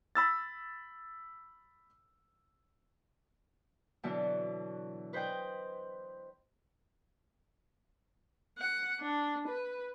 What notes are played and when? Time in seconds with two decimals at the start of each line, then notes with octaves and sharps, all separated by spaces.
0.15 B5 E6 A6
4.03 B2 D3 E3 F#3 B3
5.13 B4 C5 D#5 G5
8.58 F#5
9.00 D4
9.48 B4